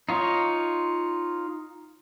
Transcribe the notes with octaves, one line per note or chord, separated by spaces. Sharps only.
D#4 F4 C#5